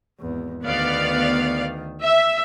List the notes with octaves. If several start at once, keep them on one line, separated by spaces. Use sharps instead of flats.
G#1 E2
D2 D#3 B3 D5 F5
E5